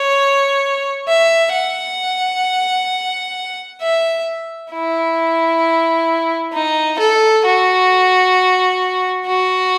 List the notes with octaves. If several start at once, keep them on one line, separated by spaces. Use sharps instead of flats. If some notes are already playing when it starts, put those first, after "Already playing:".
Already playing: C#5
E5
F#5
E5
E4
D#4
A4
F#4
F#4